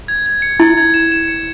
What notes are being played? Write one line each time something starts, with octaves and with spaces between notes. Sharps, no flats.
G#6
G#6
C#7
E4 G#6
G#6
E7
E7
C#7